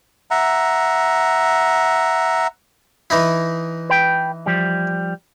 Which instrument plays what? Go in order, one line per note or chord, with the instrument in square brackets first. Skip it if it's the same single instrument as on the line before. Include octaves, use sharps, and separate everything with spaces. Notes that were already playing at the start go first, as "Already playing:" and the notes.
[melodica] E5 F#5 A#5
[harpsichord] E3 D#4 E4
[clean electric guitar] B4 G5
F3 G3